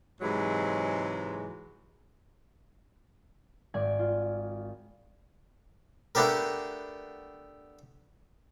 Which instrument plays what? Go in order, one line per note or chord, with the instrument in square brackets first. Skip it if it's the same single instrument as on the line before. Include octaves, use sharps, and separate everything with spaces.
[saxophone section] G#2 C3 E3 F#3 G#3
[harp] G#1 D5 G#5
F4
[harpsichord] A3 B3 D4 G4 A#4